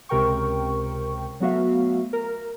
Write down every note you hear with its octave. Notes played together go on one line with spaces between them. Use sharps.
C#2 C3 A#4 G5 C#6
F#3 A3 B3 F#4 E5 F5
A#4